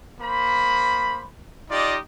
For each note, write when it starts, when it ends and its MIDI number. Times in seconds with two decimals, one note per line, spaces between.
0.21 1.24 58
0.21 1.24 72
0.21 1.24 83
1.70 1.97 63
1.70 1.97 65
1.70 1.97 67
1.70 1.97 74
1.70 1.97 75